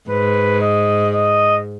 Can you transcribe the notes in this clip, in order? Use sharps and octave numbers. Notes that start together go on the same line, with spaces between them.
G#2 B4
D#5
D#5